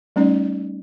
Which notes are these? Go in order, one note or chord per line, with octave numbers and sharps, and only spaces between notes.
G3 A3 C#4 D#4 D5